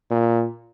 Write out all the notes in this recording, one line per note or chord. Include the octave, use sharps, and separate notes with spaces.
A#2